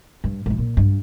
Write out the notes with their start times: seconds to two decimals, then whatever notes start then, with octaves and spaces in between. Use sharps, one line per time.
0.24 G2
0.46 G#2 F3
0.58 A#2
0.77 G2